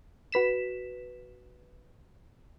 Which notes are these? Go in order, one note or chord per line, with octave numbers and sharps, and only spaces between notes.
F#4 B4 B6 E7